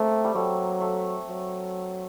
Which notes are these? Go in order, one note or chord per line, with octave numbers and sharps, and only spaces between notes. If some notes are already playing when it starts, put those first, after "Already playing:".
Already playing: A3 A#3 C4 D4
G3
F#3 A3
A3
F#3